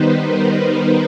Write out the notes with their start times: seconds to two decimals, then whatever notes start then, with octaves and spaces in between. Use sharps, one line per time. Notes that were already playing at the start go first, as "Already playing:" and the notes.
Already playing: D#3 G3 B3 D#4 B4 C5
0.20 A#4